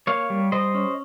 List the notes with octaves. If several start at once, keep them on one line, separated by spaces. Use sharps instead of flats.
A#3 C#5 F5
G3
G3 C5 D#5
C#4